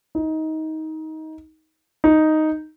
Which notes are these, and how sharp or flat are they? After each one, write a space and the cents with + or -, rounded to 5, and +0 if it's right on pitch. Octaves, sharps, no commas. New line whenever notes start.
D#4 +20
D#4 +0